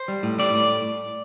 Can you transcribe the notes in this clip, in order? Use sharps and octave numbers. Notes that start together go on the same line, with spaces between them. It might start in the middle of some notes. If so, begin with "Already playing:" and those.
Already playing: C5
G3
A2
G3 D5
A2